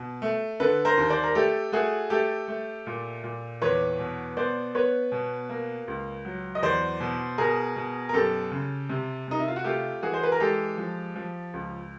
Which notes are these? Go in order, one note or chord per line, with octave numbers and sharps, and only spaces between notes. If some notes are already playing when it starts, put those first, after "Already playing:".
Already playing: B2
A3
D3 A4 B4
A#4 C5
D#2
C5 D5
A#4
A3 G4 A4
A3 F#4 G#4
A3 G4 A4
A3
A#2
A#2
E2 B4 C#5
B2
B3 C5 D5
B3 B4 C#5
B2
A#3
C#2
F#3
D#5
E2 C5 D5
B2
B2 G#4 A#4
B2
A#4
F#2 G4 A4
C#3
C3
C3 D#4
E4
F4
F#4
A3 F4 G4
E3 F#4 G#4
C5
B4
A#4
G#3 G4 A4
F3
F3
C#2